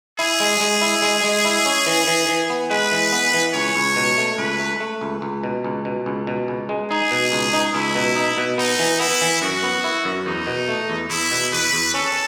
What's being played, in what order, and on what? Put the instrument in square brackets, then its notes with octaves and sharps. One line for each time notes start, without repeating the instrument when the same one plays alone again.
[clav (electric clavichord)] E4 [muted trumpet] G#4
[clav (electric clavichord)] G#3
G#3
E4
G#3
G#3
E4
C#4
E3
E3
E3
B3
[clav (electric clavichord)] G#3 [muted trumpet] B4
[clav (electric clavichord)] E3
B3
E3
[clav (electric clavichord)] C#2 [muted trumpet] C#5
[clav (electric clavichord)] C#2
B2
A3
[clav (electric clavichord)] C#2 [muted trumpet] B4
[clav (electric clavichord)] A3
A3
C#2
C#2
B2
C#2
B2
C#2
B2
C#2
G#3
[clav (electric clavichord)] D#4 [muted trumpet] G#4
[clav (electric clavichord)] B2
C#2
D#4
[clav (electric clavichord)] C#2 [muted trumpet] E4
[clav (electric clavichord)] B2
D#4
B2
[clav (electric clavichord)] B3 [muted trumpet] D#4
[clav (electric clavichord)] E3
[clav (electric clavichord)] B3 [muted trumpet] E4
[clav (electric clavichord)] E3
[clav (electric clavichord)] F#2 [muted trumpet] F#4
[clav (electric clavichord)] B3
E4
F#2
[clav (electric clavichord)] E2 [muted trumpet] D#4
[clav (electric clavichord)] B2
A3
E2
[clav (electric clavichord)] E2 [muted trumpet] E4
[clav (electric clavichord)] B2
[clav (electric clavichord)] E2 [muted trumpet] B4
[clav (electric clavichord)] E2
[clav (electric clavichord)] C#4 [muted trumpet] A4